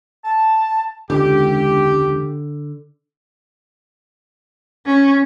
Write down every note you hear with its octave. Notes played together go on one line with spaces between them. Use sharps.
A5
E1 C#2 D3 G4
C#4